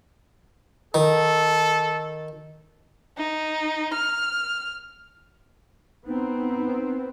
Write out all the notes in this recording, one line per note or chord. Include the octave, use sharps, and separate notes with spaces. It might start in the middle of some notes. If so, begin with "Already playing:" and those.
D#3 A4
D#4
F6
B3 C4 D#4